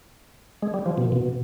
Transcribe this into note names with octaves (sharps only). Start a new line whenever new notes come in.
G#3
G3
F3
B2
A#2
B2